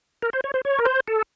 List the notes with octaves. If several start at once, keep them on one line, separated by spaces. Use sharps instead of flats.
A#4
C5
C#5
C5
C#5
A#4
C5
A4